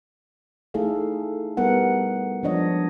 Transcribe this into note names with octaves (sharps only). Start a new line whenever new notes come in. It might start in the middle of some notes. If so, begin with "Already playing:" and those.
A3 D#4 E4 G#4 A4 F5
G3 B3 A#4 F#5
F3 G#3 D4 C#5 D#5